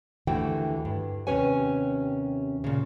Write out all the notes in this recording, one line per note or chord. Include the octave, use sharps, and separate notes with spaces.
D#2 D3 E3 A3 F#4 G5
G2
D#2 C3 C#4 B4 C#5 G#5
A#2 C#3